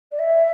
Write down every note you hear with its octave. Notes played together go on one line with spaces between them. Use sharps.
D5
E5